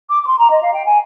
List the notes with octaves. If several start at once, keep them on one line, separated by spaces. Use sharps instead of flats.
D6
D6
C6
A#5
D#5
F5
G5
G#5